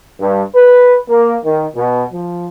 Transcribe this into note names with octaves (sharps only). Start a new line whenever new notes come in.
G2
B4
A#3
D#3
B2
F3